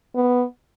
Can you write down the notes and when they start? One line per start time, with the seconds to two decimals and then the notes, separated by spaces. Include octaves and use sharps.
0.15 B3